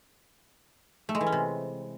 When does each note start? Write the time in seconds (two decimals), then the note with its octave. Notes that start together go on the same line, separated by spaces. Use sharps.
1.09 A3
1.15 G#3
1.21 E3
1.26 C#4
1.32 C3